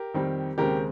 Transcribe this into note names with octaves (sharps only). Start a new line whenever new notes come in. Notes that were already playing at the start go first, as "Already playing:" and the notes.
Already playing: G4 A#4
F2 D#3 G3 C4
D#2 C#3 G#3 C4 G4 A#4